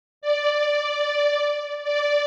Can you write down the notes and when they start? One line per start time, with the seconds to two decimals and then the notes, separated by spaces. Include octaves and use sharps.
0.22 D5
1.84 D5